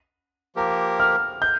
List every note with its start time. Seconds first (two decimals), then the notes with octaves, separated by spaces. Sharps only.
0.56 F3 A#3 G4 A#4
1.00 F6
1.42 G6